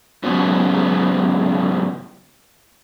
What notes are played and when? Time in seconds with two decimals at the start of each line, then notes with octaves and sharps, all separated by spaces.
0.23 G#2 C#3 F#3 B3